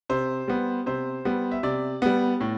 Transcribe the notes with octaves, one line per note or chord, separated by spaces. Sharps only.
C3 C5
G3 B3
C3 C5
G3 B3
E5
C3 D5
G3 B3
A2